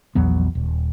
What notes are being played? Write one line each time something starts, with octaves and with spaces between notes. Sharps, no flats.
A#1 E2 F#3 B3
D#1